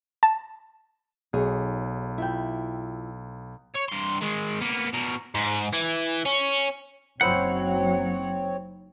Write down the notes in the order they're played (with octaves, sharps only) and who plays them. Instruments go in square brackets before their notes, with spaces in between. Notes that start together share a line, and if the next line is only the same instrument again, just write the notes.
[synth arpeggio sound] A5
[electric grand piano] B1 [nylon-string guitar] D#4 G#4 C#5
[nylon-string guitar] E4 F4 G5
[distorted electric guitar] C#5
G2 C6
D#3 G#3
A#3 B3
B2 A#4
[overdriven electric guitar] G#2
E3
C#4
[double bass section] F#1 F#3 [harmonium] C4 C#5 [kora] D#4 E4 C5 [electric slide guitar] F#5